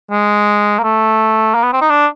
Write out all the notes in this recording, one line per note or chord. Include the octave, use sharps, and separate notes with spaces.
G#3
A#3
A3
A#3
B3
C4
D#4
D4